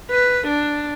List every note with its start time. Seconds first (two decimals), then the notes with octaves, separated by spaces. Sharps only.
0.11 B4
0.48 D4